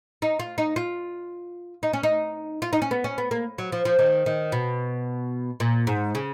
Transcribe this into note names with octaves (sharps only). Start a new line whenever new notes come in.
D#4
F4
D#4
F4
D#4
C#4
D#4
F4
D#4
C#4
B3
C#4
B3
A#3
F#3
F3
F3
D#3
D#3
B2
A#2
G#2
C#3